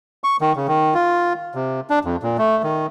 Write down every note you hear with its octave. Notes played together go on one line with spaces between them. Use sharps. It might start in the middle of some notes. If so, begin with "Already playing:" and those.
C#6
D#3
C#3
D#3
F4
C3
D4
F2
A#2
A3
D#3